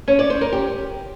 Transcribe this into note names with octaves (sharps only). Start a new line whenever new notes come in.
C#4
D5
C5
A#4
G4